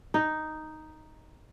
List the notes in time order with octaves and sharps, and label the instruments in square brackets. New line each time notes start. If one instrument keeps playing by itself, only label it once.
[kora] D#4